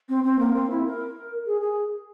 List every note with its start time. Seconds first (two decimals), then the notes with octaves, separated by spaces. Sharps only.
0.09 C4
0.24 C4
0.39 A#3
0.54 C4
0.70 E4
0.85 A#4
1.46 G#4
1.61 G#4